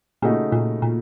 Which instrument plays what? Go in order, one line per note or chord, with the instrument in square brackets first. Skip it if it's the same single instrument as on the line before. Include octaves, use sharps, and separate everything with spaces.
[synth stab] A#2 [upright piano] C#3 A3 D#4 F#4
[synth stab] A#2
A#2